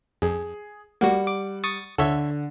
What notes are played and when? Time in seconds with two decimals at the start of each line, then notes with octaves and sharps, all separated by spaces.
0.22 F2 G#4
1.01 G3 A#3 F#4 F#5
1.27 D6
1.64 C#6 D#6 A6
1.98 D3 A4 C#5 E5